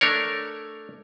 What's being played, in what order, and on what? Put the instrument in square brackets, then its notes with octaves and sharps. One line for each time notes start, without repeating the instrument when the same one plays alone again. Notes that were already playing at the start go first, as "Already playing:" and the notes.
[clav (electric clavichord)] A3 D4 A#4 C#5